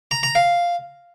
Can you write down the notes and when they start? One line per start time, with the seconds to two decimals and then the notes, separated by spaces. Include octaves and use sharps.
0.11 A#5
0.23 A#5
0.35 F5